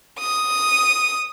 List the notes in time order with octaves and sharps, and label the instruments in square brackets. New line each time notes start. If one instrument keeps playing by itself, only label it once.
[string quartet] D#6